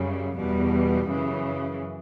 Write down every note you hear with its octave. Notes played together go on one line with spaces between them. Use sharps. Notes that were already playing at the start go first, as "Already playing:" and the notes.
Already playing: F#2 C#3 G3
E2 B2 G3
F#2 C#3 E3